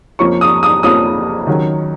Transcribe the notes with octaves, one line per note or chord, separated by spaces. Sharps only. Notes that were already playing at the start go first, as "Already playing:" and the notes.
F2 F3 A#3 C#4 C#6
D#6
D#6
F2 F3 A#3 C#4 D#6
D#3 F#3 C#4